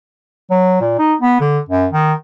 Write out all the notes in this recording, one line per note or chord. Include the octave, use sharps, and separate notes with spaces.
F#3
A#2
D#4
B3
D3
F#2
D#3